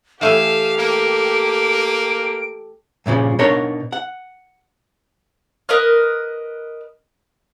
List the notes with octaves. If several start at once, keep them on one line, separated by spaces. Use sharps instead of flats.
E3 A3 G4 A4 F5 G#5 E7
A#3 D7
G2 A#2 C#3 F3
B2 D4 D#4 A#4 C#5 C6
F#5
A#4 B4 D#5 F6